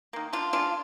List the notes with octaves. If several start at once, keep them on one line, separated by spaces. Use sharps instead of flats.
D#3 A#3
D3 D4 F4
G#3 D4 F4